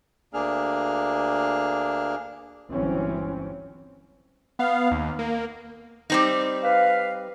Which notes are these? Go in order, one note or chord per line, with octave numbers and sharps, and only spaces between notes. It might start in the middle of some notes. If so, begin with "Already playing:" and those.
D2 A#3 D4 G#4 F6
G1 C#2 E3 F#3 C4 C#4
B3 F5
D#2
A#3
G3 C4 D#4
B4 F5